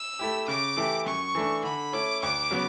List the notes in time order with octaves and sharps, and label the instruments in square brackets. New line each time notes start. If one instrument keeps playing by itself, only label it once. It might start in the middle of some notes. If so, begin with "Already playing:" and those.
Already playing: [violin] E6
[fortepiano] A3 E4 G4
[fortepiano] C#3 [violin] D6
[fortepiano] E3 A3 E4 G4
[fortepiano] F#2 [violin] C#6
[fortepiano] E3 A3 D4
[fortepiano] D3 [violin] B5
[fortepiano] A3 C#4 E4 [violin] D6
[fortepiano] D2 [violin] D6
[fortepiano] C#3 F#3 B3